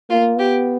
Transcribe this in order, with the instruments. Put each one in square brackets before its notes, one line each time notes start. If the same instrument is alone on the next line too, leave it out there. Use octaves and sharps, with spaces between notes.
[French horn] A#3 [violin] F4
[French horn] B3 [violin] G4